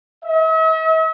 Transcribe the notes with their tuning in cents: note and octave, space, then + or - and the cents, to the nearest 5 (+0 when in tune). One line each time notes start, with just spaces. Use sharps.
E5 -45